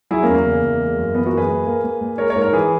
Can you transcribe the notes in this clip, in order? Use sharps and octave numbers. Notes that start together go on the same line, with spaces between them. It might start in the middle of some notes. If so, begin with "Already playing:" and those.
F#3 E4 G#4
A#3 C#4
E2
A#3
C#3
E2
G#3
F#2
E3 B3
F#4 A#4
F#2
G#4 B4
A#2
A#3
A#3
A#2
G#3 A#4 C#5
A#4 C#5
G#2
A#4 C#5
E3 G#4 B4